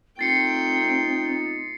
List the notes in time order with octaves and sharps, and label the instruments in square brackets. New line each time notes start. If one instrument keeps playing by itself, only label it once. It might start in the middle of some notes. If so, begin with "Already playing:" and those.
[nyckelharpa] A3 G5 [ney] C4 [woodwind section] D#4 F4 [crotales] A6 C7 C#7